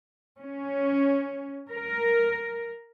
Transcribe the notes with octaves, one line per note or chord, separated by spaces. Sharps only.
C#4
A#4